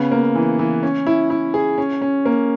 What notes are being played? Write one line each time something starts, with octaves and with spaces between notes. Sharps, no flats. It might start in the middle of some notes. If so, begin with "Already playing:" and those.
Already playing: C#3 B3
A#3
E3
E3
C#4
E4
E4
G#4
C#4
C#4
A#3